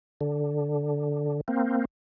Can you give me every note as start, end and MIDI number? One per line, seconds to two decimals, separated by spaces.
0.21 1.41 50
1.48 1.85 58
1.48 1.85 60